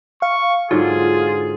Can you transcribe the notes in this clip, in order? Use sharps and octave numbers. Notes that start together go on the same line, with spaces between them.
F5 C#6
G#2 D3 F#3 F4 G#4